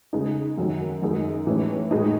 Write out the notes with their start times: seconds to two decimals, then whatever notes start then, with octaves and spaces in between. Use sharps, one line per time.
0.13 C#3 G#3 D#4
0.58 F#2 D#3 F#3
1.02 F#2 D#3 G#3 D#4
1.47 A2 E3 G#3 C#4 E4
1.91 A2 G#3 D#4